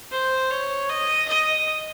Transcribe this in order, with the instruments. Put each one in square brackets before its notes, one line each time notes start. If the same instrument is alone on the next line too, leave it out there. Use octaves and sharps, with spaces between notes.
[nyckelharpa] C5
C#5
D#5
D#5